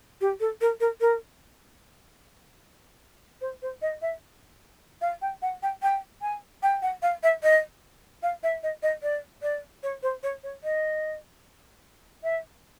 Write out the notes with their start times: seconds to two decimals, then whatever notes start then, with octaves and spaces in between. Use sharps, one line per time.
0.21 G4
0.40 A4
0.61 A#4
0.80 A#4
1.01 A#4
3.41 C5
3.62 C5
3.82 D#5
4.02 E5
5.01 F5
5.22 G5
5.42 F#5
5.63 G5
5.82 G5
6.22 G#5
6.63 G5
6.82 F#5
7.02 F5
7.23 E5
7.43 D#5
8.23 F5
8.43 E5
8.63 D#5
8.83 D#5
9.03 D5
9.42 D5
9.83 C#5
10.03 C5
10.23 C#5
10.43 C#5
10.64 D#5
12.23 E5